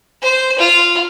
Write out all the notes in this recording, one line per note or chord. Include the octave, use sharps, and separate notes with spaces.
C5
F4